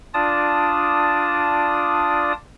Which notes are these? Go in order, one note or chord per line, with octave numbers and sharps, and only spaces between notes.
D4 F4 D5 A5 D#6